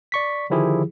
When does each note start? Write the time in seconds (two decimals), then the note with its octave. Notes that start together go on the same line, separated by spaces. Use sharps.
0.12 D5 C#6 B6
0.50 D3 D#3 F3 E4 G4 G#4